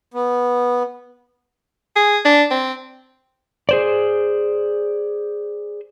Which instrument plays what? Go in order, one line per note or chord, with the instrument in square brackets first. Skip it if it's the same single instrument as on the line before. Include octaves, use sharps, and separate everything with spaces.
[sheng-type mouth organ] B3
[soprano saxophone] G#4
D4
C4
[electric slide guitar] G#4 C5 D5